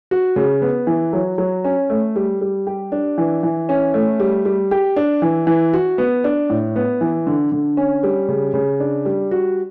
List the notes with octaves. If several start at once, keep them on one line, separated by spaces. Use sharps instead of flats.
F#4
C#3
B3
E3
F#3
F#3
C#4
A3
G3
G3
G4
D4
E3
E3
C#4
A3
G3
G3
G4
D4
E3
E3
F#4
B3
D4
A2
B3
E3
D3
D3
C#4
G3
C#3
C#3
D4
G3
F#4